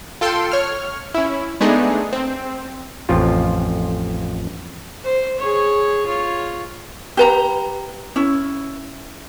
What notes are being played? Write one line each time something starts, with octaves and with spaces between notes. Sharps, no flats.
F4 A4 G5 C6
C#5 F6
C#4 E4
G#3 A3 B3 D4 D#4 G#4
C4
A1 F2 F3 F4
C5
G#4 C#5
F4 C#5
G4 B4 A#5
C#4 E4